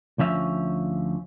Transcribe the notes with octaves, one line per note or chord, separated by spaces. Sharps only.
D2 F3 C#4 E5